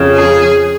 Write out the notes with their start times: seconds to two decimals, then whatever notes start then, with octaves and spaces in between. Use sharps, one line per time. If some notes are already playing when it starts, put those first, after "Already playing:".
Already playing: F2 C#3
0.14 G#4